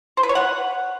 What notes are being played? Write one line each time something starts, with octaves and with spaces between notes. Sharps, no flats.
C5
B4
C#5
F#5